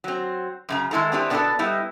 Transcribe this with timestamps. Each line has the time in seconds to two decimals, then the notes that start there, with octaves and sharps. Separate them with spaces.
0.04 F#3 C4
0.69 F#2 C#3 A#5
0.91 D#3 G#3 E4 A4 A#5
1.12 B3 C4 D4 E4 G4 B4
1.30 B2 B3 D4 F#4 A4 D5
1.59 G3 B3 D#4 E4